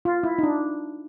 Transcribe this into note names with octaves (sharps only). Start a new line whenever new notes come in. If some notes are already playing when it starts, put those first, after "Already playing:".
F4
E4
D#4
D4